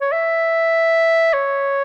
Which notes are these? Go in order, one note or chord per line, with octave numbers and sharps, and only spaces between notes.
C#5
E5
C#5